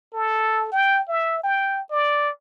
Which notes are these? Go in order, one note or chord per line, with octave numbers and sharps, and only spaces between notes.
A4
G5
E5
G5
D5